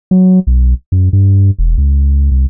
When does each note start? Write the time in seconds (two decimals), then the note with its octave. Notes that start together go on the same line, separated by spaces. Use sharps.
0.11 F#3
0.47 B1
0.92 F#2
1.13 G2
1.59 E1
1.78 C#2
2.31 C2